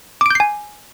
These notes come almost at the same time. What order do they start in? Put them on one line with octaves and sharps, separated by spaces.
D6 D7 G6 C7 G#5